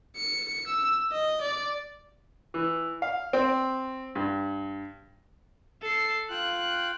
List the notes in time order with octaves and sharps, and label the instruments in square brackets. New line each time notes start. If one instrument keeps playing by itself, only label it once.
[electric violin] C#7
E6
D#5
D5
[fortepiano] E3
F5
C4
G2
[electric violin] A4 C7
[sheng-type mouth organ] F4 F5 G5 [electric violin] F#6